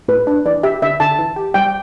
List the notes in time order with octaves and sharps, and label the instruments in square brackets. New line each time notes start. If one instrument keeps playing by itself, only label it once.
[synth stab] A2 [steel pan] B4
[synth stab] D4
[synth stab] E3 [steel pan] D5
[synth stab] G4 [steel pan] E5
[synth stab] D3 [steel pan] E5
[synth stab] D3 [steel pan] A5
[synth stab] E3
G4
[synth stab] G3 [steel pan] G5